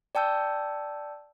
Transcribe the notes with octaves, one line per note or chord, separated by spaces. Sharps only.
D5 G5 A5 E6 G6